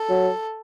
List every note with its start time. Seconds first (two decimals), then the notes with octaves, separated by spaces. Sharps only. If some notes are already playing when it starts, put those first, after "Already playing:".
Already playing: A4
0.09 F#3